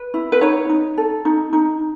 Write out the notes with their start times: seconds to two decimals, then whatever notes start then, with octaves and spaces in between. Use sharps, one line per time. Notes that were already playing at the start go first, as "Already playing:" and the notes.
Already playing: B4
0.14 E4
0.32 B4
0.41 D#4 C#5
0.69 D#4
0.98 A4
1.25 D#4
1.53 D#4